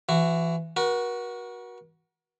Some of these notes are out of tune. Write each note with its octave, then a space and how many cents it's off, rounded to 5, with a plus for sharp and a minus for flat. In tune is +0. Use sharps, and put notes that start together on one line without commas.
E3 +25 F#4 +0
F#4 +0 A#4 +45